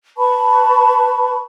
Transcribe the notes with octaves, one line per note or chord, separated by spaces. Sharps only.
B4 A5 B5 C#6